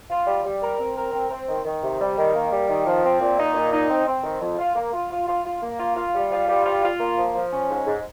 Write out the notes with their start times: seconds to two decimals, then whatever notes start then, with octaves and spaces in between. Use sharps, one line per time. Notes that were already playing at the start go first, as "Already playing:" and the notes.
0.10 F4
0.27 G3
0.45 G3
0.62 A#4
0.79 C4
0.97 A#4
1.13 C4
1.30 C4
1.48 D#3
1.65 D#3
1.83 C3
2.00 G3
2.18 D#3
2.34 A#3
2.52 G3
2.69 D#3
2.86 F3
3.04 C4
3.20 A#2
3.38 D#4
3.55 A#2
3.72 D#4
3.89 C4
4.07 C4
4.24 D#3
4.41 F2
4.59 F4
4.75 A#3
4.93 F4
5.11 F4
5.27 F4
5.45 F4
5.62 A#3
5.79 F4
5.96 F4
6.15 G3
6.31 F4
6.48 G3
6.65 F4
6.83 F4
7.00 A#3
7.17 F3
7.35 F3
7.52 C#4
7.70 G#2
7.86 G#2